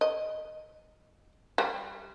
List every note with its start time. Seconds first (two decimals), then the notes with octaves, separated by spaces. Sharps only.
0.01 D#5
1.58 G3